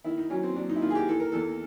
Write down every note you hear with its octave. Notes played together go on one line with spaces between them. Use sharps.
D#3 E4
D#4
F#3 C#4
C4
F#3 D4
D#4
E4
D#3 F4
G#4
G4
E3 A4
A#4
E2 A4